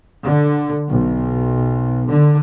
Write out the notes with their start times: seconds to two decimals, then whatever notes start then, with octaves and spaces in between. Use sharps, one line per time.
0.24 D3
0.87 B1
2.09 D3